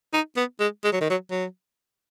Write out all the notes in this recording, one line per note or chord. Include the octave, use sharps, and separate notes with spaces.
D#4
B3
G#3
G#3
F#3
D#3
F#3
F#3